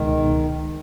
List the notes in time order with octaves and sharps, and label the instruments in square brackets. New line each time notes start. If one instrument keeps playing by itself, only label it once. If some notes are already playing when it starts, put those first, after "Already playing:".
Already playing: [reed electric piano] C#2 B2 G#3 D#4 [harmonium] D#3